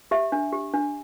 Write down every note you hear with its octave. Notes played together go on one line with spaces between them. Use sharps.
G4 E5
D4
G4
D4